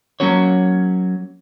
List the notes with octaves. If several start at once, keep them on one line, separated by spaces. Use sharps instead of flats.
F#3 A#3 C#4 F#4 C#5